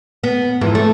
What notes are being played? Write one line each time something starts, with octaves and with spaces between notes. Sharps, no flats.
B3
F2 G#2 E3
A3